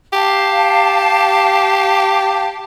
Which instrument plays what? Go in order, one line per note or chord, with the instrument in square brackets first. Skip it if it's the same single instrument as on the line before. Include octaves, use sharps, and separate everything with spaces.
[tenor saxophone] G4 [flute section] F5 A5